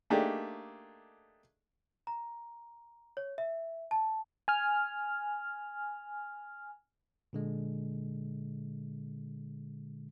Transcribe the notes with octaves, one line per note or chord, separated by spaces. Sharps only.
A3 A#3 D4 D#4 G4 G#4
A#5
C#5
E5
A5
G#5 F6
A#2 D3 G#3